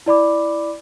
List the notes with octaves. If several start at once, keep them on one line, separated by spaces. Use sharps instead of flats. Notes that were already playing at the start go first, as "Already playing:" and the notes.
E4 D5 B5 D6